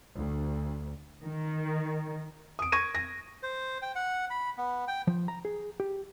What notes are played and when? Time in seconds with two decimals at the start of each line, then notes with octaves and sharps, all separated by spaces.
0.15 D2
1.22 D#3
2.59 D#6 D7
2.72 C#6 G#6 A#6 D#7
2.95 A#6
3.43 C5
3.82 G5
3.95 F#5
4.30 B5
4.58 B3
4.88 G5
5.07 F3
5.28 A#5
5.45 G#4
5.80 G4